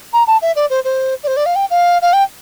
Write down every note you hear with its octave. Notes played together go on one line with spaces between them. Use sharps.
A#5
A5
E5
D5
C5
C5
D5
C5
D5
F5
G5
F5
F5
G5